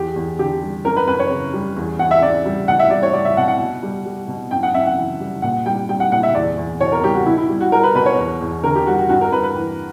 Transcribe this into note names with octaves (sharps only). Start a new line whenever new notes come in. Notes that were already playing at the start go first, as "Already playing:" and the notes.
Already playing: E2 G4
E2
D3 G4
G3
F#2 A#4
B4
F#2 B4
C#5
C#3
G3
E2
E2 F#5
E5
C#3 D5
G3
B2 F#5
E5
G3 D5
C#5
G3 D5
E5
B2 F#5
F#5
B2
G3
G3
B2
F#2 G5
F#5
F#2 E5
F#5
E3
G3
A#2 F#5
G3 G5
G3 G5
F#5
A#2 F#5
E5
E2 D5
E2
B2 C#5
A#4
G3 G4
F#4
B2 E4
E4
G3
F#4
G3 A#4
B4
B2 B4
C#5
E2
E2
D3 A#4
G4
G3 F#4
F#4
G2 F#4
A#4
G2 B4
B4
E3